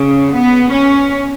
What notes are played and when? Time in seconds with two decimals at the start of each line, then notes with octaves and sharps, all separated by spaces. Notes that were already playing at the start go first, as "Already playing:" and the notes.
Already playing: C#3
0.32 B3
0.72 C#4